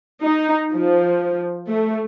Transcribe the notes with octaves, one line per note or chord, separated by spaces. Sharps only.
D#4
F3
A3